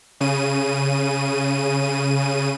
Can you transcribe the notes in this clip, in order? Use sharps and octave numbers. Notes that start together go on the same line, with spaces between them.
C#3 D#7